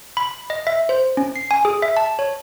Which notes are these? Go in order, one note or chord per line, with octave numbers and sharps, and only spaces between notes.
B5
D#5
E5
C5
C#4
C7
G#5
G#4
E5
A5
C#5